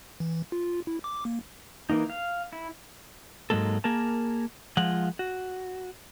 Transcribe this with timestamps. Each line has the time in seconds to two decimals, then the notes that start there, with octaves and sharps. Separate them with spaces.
0.20 E3
0.52 F4
0.87 E4
1.04 D6
1.25 A#3
1.90 E3 A#3 D#4
2.10 F5
2.53 E4
3.50 G#2 F#3 G#3 A#3 A4
3.84 A#3 G#4 A#4 A5
4.77 F3 G#3 F4 F#5
5.19 F#4